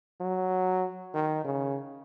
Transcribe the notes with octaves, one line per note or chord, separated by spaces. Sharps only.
F#3
D#3
C#3